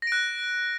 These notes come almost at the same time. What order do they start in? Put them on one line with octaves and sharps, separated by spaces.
A#6 D7 F#6